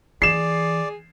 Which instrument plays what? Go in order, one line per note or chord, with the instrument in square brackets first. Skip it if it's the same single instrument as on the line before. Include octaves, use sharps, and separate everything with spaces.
[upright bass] E3 [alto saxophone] G#4 [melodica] D5 [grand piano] C7 E7